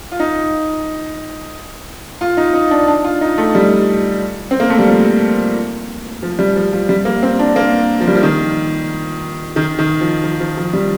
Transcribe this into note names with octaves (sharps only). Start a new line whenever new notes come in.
F4
D#4
F4
D#4
D#4
D4
D4
F4
D#4
A3
G3
C4
A#3
A3
G3
F3
F3
G3
F3
F3
G3
A#3
C4
D4
A#3
F3
G3
F3
D#3
D#3
D#3
F3
F3
F3
F3
G3